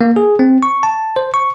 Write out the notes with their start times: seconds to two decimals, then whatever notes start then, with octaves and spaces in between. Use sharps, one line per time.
0.01 A#3
0.16 G#4
0.39 C4
0.63 C#6
0.83 A5
1.16 C5
1.34 C#6